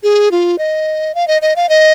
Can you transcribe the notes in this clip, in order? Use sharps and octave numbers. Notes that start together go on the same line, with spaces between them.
G#4
F4
D#5
F5
D#5
D#5
F5
D#5